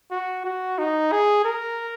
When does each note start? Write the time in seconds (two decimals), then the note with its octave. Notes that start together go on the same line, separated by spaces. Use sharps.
0.11 F#4
0.45 F#4
0.79 D#4
1.12 G#4
1.45 A#4